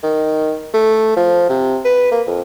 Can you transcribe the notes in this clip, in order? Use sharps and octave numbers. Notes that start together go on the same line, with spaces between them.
D#3
A3
F3
C3
B4
A#3
F2